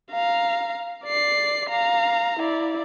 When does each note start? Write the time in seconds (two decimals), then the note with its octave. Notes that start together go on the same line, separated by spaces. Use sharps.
0.12 F5 A#5
1.04 D5 C7
1.70 F5 A#5
2.40 E4 D5